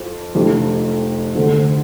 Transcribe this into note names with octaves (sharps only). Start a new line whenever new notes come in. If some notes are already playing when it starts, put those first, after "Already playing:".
Already playing: F2 F3 F4
F1 F2 F3 D4 G4
D2 D3 F3